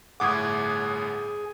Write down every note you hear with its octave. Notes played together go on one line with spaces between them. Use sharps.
G1 A2 G#4 F#5 D6 D#6 G#6